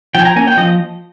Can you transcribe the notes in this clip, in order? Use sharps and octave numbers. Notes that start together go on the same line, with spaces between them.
F3 G5
G#5
A#5
A#3 C#4 G#5
G5
F3 D#5